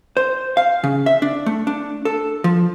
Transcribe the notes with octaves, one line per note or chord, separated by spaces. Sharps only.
C5
F5
C#3
E5
D4
A3
D4
A4
F3